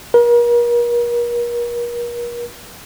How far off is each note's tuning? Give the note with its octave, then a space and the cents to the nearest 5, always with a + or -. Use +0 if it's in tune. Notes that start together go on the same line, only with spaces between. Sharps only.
A#4 +40